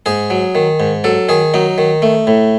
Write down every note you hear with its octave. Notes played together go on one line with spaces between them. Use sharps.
G#2 G#4
F#3
D#3
G#2
F#3 A4
D#3 G#4
F#3 D#4
D#3
A3
A2